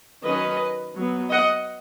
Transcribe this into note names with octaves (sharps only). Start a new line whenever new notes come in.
D#3 F#3 C#4 B4 D#5
F#3 B3
D#5 F#5